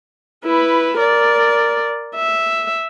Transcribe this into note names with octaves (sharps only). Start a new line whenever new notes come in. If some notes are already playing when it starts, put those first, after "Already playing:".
E4 B4
A#4 D5
E5